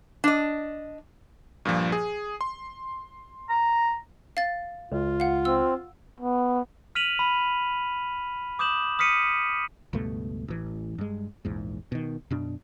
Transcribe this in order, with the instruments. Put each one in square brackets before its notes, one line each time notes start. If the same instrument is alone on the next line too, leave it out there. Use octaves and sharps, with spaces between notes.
[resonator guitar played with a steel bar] D4 D#5
[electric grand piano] G2 A#2 F3
G#4
C6
[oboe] A#5
[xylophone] F5 A6
[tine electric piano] C#2 [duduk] F4
[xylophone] F5 F#5
[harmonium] C4 [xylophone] E6
[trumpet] B3
[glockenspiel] F6 B6 D#7 F7 F#7
B5
D6 D#6 G6 E7 F#7
D#6 F6 B6 C#7 D#7
[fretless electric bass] C#2 G2 B2 A3
A1 E3
G2 G#3
A#1 E2 G#2
B2 D#3
F#2 B2 D4